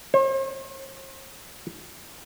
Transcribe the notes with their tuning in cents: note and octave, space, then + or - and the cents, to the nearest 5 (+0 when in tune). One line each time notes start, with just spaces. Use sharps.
C5 +45